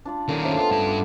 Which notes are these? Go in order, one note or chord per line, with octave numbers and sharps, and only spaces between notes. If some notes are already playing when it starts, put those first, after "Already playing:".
D4 F4 D5
D3 D#3 A#3 C#4
C#3 F3 A3
B3 D4 F4
G2 A5
F4 A4 D5